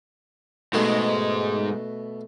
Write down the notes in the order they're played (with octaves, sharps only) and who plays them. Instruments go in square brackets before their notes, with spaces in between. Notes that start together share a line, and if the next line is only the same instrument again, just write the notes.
[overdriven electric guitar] G#2 G#3 [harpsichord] B2 A3 B3